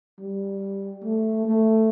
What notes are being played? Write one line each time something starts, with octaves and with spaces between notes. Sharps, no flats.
G3
A3
A3